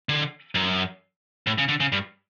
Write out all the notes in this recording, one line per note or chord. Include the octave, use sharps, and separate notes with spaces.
D3
F#2
A2
C#3
D3
C#3
G2